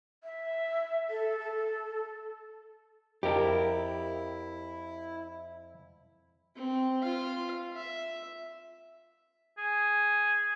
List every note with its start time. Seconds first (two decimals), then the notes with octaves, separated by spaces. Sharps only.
0.24 E5
1.10 A4
1.39 A4
3.23 F2 E4 G4 A#4
6.56 C4
7.03 F4 F5
7.76 E5
9.58 G#4